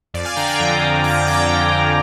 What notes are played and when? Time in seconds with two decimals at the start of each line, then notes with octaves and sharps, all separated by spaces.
0.14 F2 D5
0.25 F5 G#5
0.36 D3 G5 A#5
0.47 A#5 D6
0.60 F2
0.82 D3
1.04 F2 A#5 D6
1.26 D3 G5 A#5
1.49 F2
1.73 D3